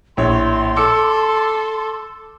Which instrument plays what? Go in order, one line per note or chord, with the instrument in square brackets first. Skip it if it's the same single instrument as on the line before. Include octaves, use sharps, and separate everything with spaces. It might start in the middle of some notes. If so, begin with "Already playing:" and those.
[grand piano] A#1 A2 C#5 [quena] C6
[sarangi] A4 [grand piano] D6 E6 C#7